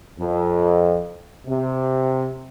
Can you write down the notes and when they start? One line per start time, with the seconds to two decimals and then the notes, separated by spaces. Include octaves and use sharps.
0.20 F2
1.47 C3